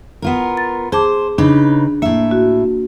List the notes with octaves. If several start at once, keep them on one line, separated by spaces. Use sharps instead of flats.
B3 F4 A#4
A6
G#4 C5 A5 D6
C#3 D4 D#4 B4
A2 A#3 E5
F#4